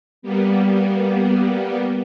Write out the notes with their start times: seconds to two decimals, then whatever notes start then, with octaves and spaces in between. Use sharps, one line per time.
0.22 G3 A#3 B3